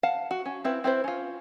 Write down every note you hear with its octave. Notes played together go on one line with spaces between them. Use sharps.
F5 F#5 A5
F#4
C#4
C4 E4 B4
C4 E4 B4 C5
C#4 F4